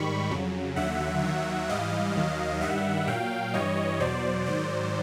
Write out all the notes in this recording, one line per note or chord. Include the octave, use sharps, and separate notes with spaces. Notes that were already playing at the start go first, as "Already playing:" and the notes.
Already playing: G#2 D#3 G3 B5 C#6
F2 C#3 F#3
D#2 D3 F#3 E5 F#5
D#2 D#3 F#3
G#2 E3 G3 D#5 F5
D#2 D#3 F#3
G2 D#3 G3 E5 F#5
A#2 F#3 F5 G5
G2 E3 G3 C#5 D#5
E2 B2 F#3 C5 D5
G#2 D#3 F#3 C5 D5